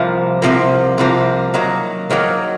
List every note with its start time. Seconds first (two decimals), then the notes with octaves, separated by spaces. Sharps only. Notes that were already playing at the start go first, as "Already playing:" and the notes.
Already playing: C2 C3 F3 A#3
0.42 C2 C3 F3 A#3
0.98 C2 C3 F3 A#3
1.54 D#3 F#3 A#3
2.10 D#3 F#3 A#3